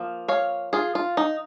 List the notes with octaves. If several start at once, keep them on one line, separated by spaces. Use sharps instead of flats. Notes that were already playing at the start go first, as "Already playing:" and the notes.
Already playing: F3 A#3
C#5 F5
F4 G#4
F4
D#4